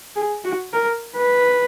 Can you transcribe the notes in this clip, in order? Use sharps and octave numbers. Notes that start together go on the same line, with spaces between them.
G#4
F#4
A#4
B4